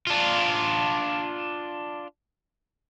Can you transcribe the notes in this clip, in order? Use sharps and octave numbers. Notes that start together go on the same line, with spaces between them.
D4 F4